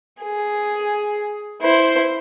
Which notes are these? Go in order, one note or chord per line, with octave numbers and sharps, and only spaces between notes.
G#4
E4 C5